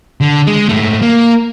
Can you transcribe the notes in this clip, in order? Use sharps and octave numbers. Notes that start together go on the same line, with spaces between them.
D3
G#3
G#2 A3
A#3